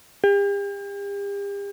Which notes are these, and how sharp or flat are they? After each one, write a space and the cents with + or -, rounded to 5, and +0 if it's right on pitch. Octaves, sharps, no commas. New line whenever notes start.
G4 +40